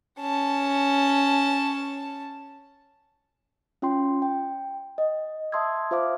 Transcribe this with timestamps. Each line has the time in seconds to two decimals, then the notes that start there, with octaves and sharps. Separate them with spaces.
0.21 C#4 A5
3.82 C#4 F4 G5 C6
4.22 G5
4.98 D#5
5.52 E5 A5 C6 D#6 E6 G#6
5.91 F4 C5 E5 F5 D6